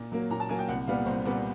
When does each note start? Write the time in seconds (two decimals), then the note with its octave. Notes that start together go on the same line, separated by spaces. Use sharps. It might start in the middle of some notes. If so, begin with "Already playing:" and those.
Already playing: A#2
0.12 F#3 A#3
0.30 A#2 A#5
0.40 A5
0.49 F#3 A#3 G#5
0.59 G5
0.68 C2 F#5
0.87 A#2 G3 B3 F5
1.06 C2 C5
1.25 A#2 G3 B3